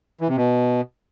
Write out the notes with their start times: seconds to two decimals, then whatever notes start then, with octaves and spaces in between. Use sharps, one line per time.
0.21 E3
0.29 C3
0.37 B2